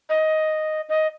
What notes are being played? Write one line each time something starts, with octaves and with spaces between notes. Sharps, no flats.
D#5
D#5